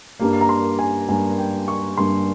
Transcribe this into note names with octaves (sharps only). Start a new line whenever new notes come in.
G2 G3 A#3
A#5
C6
G#5
G2 G3 A#3 G#5
G5
C#6
G2 G3 A#3 C6